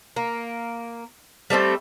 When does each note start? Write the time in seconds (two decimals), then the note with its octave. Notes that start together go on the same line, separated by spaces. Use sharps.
0.16 A#3
1.50 G3 A3 C4 A4